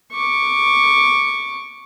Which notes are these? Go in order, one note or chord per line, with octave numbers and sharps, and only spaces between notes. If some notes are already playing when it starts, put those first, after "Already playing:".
C#6 D6